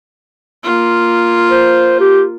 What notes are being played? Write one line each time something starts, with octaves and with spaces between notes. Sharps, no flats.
A#3 F4
C5
G4